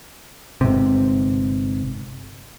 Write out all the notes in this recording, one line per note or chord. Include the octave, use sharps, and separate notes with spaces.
G1 G#2 C3